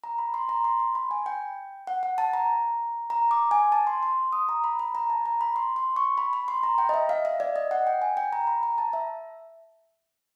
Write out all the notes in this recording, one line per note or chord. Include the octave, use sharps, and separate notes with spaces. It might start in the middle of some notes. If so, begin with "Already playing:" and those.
A#5
B5
C6
A#5
C6
C6
B5
G#5
G5
F#5
F#5
A5
A#5
A#5
D6
G#5
A5
C6
C6
D#6
A#5
B5
B5
A#5
A5
A#5
B5
C6
C6
C#6
B5
B5
C6
A#5
G5
D#5
E5
F5
E5
D5
D#5
F#5
G5
G#5
G5
A#5
B5
A#5
A5
E5